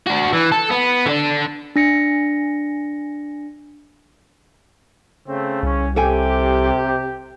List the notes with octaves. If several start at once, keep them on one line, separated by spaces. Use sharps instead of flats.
D4 F#4
E3
A4
B3
D3 D4
D4 A#6 C#7
C#3 A3 C4
C2 C#4
C3 G4 A4 G5 G#5